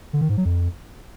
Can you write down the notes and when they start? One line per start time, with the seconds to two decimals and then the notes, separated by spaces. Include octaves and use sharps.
0.13 D3
0.21 D#3
0.29 G#2
0.37 F#3
0.45 F2